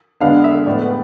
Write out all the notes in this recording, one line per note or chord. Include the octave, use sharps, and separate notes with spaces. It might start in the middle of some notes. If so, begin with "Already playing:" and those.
D3 G#3 B3 D4 F5
E5
A2 G#3 B3 D5
B4